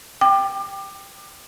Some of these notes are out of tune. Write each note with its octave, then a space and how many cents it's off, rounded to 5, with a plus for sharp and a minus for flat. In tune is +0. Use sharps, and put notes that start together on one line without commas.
G5 +0 D6 +25